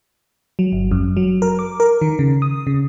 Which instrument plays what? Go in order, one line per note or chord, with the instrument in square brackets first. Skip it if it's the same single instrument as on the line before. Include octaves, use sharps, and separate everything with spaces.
[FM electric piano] F#3
G1
F#2
F#3
A#4
D6
A#4
D#3
C#3
D#6
C#3